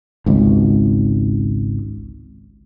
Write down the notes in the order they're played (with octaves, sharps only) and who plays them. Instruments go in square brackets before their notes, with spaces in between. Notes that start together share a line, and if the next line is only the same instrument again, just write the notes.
[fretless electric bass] G#1 C#2